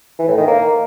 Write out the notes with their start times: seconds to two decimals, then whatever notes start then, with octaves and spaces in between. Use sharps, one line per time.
0.18 E3
0.28 A2
0.38 D#3
0.47 A#3